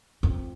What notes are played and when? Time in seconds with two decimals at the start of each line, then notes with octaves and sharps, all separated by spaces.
0.23 F2